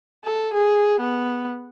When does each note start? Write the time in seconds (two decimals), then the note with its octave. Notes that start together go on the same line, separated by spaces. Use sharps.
0.25 A4
0.54 G#4
1.00 B3